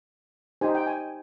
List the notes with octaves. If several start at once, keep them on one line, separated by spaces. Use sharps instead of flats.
D#4 G4 C5 G#5
G5
G#5